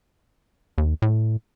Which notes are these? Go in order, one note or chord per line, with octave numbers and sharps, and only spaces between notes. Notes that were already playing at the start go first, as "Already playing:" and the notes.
D#2
A2